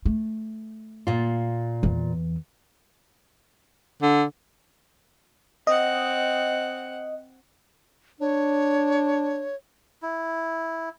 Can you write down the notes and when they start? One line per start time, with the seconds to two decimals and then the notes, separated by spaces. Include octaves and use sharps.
0.05 A3
1.07 A#2 F4
1.83 E2 E3
4.02 D3
5.67 C4 D#5 F#5
8.20 D4 C#5
10.02 E4